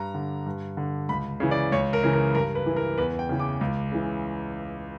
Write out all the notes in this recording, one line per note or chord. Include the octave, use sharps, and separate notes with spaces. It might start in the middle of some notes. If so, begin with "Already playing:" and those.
Already playing: G2 A#5
D3
G2
D3
C#2 B5
C#3 E3
D5
C#2 C#5
A#4
C#3 E3
A#4
G2 A#4
B4
E3
A#4
E2 B4
G5
C#3 E3
D6
C#2
C#3 E3